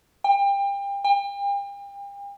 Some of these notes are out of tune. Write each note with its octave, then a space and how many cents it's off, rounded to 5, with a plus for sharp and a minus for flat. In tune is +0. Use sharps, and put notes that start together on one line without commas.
G5 +30
G5 +40